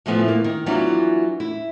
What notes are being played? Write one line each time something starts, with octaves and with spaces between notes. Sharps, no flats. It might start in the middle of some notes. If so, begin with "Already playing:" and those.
A2 E3 F3 B3
A#3
D#3
E3 F#3 G3 B3 D4 F4
E4